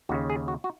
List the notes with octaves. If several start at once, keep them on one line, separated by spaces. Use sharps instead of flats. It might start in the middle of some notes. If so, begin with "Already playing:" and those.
D#2 C#3 F#4
G#4
F#4
F#4